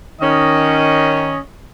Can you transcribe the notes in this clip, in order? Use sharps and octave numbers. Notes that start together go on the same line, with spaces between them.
D#3 C#4 D#5